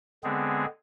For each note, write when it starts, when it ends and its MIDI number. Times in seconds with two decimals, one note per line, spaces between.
0.24 0.65 50
0.24 0.65 56
0.24 0.65 59
0.24 0.65 60
0.24 0.65 68